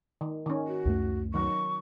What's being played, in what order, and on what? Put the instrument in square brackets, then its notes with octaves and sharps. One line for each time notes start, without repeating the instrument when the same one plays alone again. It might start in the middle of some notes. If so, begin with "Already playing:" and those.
[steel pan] D#3
D#3 C#4
[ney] F#4
[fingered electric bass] C#2 F#2 A3
[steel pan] D#3 F#3 [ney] C#6